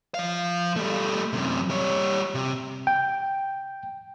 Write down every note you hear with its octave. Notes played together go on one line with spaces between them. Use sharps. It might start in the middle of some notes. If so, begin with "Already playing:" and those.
F3 F5
G3 A3
F#2 C3
G3 C#5
C3
G5